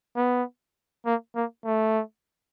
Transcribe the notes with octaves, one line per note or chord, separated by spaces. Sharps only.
B3
A#3
A#3
A3